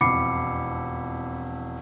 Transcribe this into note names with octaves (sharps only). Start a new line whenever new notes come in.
E1 F2 B5 D6 C7 C#7